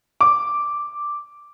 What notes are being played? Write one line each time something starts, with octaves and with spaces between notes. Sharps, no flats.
D6